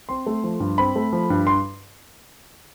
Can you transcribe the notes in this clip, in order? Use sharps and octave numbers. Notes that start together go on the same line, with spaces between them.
C4 C6
A3
F3
G2
C4 B5
A3
F3
G2
C6